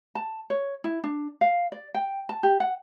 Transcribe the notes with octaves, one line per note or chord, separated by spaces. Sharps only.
A5
C#5
E4
D4
F5
D5
G5
A5
G4
F#5